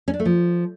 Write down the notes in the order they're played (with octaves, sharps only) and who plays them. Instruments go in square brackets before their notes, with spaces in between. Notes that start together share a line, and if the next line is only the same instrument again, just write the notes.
[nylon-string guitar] C#4
D4
A3
F3